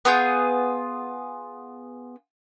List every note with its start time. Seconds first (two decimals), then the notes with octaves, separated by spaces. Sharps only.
0.05 B3 F4 G#4 G6